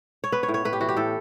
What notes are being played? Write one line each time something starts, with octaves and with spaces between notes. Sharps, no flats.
C#5
B3 B4
C#5
A2
C#5
A2 B4
G4
E3 F#4
G4
A2 A4